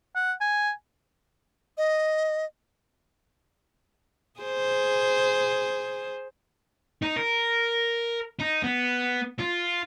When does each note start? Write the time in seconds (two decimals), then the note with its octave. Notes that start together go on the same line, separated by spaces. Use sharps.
0.15 F#5
0.41 G#5
1.77 D#5
4.40 G#4 C5
7.02 D#4
7.16 A#4
8.39 D#4
8.63 B3
9.39 F4